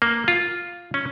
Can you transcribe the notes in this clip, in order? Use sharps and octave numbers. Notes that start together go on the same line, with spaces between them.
A#3
F4
C#4